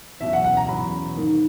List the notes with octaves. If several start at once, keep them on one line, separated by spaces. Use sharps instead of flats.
E2 B2 F#3 C#4 E5
F#5
F#5
A#5
E2 B2 F#3 C#4 B5
G#2 D#3 A#3